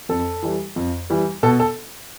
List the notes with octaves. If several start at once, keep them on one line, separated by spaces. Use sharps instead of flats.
F2 A4
E3 G3
F2
E3 G3
B2 A4
A4